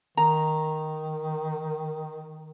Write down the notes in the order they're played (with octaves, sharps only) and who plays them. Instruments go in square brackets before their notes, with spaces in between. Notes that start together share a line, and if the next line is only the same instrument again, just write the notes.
[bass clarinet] D#3 [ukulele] A#5